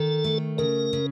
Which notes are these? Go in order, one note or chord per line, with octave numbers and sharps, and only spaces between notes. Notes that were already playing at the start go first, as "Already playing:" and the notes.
Already playing: D#3 A4
A3
C#3 A#4
C#3